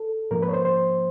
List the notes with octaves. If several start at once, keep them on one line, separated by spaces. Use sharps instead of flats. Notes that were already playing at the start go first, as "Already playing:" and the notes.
Already playing: A4
G#2 F3 A#3 C#4 A#4
B4
C#5
C5
C5